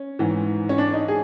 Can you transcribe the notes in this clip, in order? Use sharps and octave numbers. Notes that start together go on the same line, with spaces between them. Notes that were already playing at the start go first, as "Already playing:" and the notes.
Already playing: C#4
G#2 E3
C#4
D4
D#4
G#4